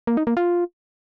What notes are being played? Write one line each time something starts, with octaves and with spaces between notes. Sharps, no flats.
A#3
D#4
A#3
F4